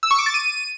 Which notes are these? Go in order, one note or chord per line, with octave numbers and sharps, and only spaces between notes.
E6
C#6
D6
A6
D#7